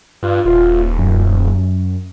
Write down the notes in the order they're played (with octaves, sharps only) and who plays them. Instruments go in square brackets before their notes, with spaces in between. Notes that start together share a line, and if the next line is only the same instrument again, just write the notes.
[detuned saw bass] G2 [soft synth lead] F4
[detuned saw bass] D#1 [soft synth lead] F4
[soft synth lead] F#2